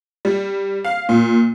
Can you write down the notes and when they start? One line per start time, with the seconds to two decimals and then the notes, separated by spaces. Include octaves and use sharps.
0.25 G3
0.84 F5
1.09 A#2